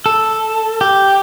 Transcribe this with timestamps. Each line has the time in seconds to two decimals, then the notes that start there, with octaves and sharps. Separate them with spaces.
0.06 A4
0.81 G4